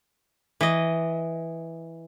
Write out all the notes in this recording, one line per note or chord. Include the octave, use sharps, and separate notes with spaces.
E3 D#5